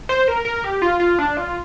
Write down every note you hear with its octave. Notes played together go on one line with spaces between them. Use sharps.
C5
A#4
A#4
G4
F4
F4
D4
F4